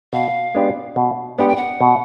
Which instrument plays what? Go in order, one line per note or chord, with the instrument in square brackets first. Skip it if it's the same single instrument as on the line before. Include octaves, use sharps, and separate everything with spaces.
[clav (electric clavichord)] B2 [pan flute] F5
[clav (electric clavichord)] G#3 B3 D4 G4
B2
[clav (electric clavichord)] G#3 B3 D4 G4 [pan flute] F#5
[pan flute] G5
F#5
[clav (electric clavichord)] B2